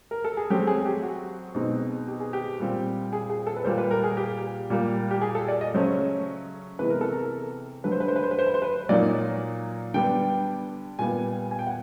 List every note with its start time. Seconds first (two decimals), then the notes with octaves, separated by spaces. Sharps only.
0.11 A#4
0.24 A4
0.37 G#4
0.50 F#3 A3 C4 G4
0.67 G#4
0.86 G4
1.03 F#4
1.55 B2 G#3 C4 D#4
2.08 G4
2.20 G#4
2.33 G4
2.60 A#2 G3 C4
3.13 G#4
3.30 G#4
3.47 A4
3.57 B4
3.64 A#2 G3 A#3 C5
3.78 B4
3.91 A#4
4.04 G#4
4.17 G4
4.70 A#2 G3 A#3
5.11 G4
5.21 G#4
5.35 A4
5.48 D5
5.61 D#5
5.74 C#3 F#3 A3 C#4 C5
6.79 C3 E3 G#3 B3 B4
6.90 A#4
7.01 A4
7.12 A#4
7.84 D3 F#3 A3 B4
7.92 C5
8.00 B4
8.08 C5
8.16 B4
8.23 C5
8.31 B4
8.39 C5
8.47 B4
8.54 C5
8.62 B4
8.89 A#2 F#3 A#3 D#4 D5
9.94 D3 G3 B3 D4 G5
10.99 A#2 G3 B3 G#5
11.51 G#5
11.59 G5
11.67 F#5